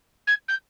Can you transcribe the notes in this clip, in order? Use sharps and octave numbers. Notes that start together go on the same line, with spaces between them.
G#6
G6